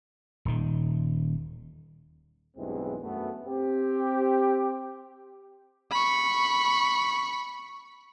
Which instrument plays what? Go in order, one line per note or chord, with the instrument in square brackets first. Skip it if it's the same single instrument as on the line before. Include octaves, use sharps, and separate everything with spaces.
[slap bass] D#1 D#3
[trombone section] B1 E2 G2 E3 G#3 C4
F#2 A3 B3
C4 G4
[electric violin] B5 C#6